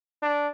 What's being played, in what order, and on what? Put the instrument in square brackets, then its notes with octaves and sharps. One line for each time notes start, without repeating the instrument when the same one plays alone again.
[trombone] D4